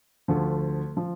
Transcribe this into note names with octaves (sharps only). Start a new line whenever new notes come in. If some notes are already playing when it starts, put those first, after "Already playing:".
D2 D3 F3 A3
F3